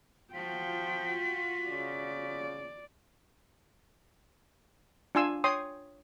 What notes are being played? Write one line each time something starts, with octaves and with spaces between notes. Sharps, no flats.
F3 F4 F#4 G5 B6
C#3 D5
D4 F4 G#5 C6 E6
C#5 G5 C6 D#6